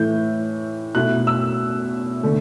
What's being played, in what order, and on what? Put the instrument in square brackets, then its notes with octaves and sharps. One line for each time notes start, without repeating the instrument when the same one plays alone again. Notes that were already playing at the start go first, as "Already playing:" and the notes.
Already playing: [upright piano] A2 E3 A3 G6
B2 A3 E4 F#6
E6
D3 A3